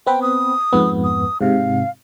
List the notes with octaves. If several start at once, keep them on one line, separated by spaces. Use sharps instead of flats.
B3 C4 B4 G5
D#6
F2 G#2 B3
D#6
G#2 C3 F5